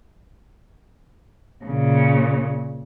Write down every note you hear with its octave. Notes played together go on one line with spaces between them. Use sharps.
A#2 C#3